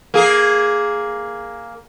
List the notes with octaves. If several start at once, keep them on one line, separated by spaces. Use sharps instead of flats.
A#3 G#4